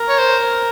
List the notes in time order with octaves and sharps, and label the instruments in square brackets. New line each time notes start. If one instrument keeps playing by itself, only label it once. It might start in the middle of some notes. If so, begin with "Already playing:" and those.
Already playing: [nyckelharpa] A#4
[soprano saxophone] C#5
C5